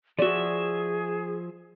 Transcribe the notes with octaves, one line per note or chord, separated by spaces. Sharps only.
F3 F#4 G#4 D5 E5